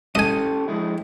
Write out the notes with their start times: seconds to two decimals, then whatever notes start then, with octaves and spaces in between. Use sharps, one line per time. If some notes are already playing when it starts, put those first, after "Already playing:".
0.15 C#4 G4 A4 D#5 G#5
0.68 F2 G#3 E4